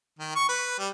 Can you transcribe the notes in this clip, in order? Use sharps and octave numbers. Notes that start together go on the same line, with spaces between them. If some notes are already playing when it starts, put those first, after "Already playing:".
D#3
C#6
B4
G3